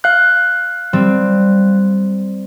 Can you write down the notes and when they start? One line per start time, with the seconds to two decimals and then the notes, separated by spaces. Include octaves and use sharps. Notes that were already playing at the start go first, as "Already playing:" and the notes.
0.04 F5 F#6
0.93 G3 C4